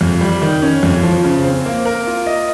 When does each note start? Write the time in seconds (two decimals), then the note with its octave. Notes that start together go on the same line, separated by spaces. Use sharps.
0.01 F2
0.21 G3
0.42 D#3
0.62 C#4
0.83 F2
1.03 F3
1.24 C#3
1.45 C4
1.65 A#3
1.85 A#4
2.07 F4
2.27 D#5